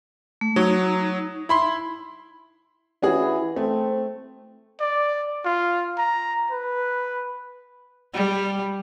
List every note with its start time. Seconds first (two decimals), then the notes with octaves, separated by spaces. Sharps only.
0.41 A3
0.56 F#3 D#4 C#5
1.49 E4 B5 C6
3.03 E3 C#4 F#4 G#4
3.56 A3 C4
4.80 D5
5.45 F4
5.98 A#5
6.51 B4
8.13 G3